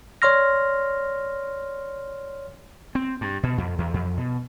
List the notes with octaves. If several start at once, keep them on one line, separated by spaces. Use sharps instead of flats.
C#5 D5 C6 F6 A#6
C4
G2
B2
F2
E2
F2
B2